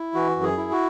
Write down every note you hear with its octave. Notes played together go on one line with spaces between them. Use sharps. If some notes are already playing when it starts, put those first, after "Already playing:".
Already playing: E4
E3 F#4
F#2
G#4
E4
F#4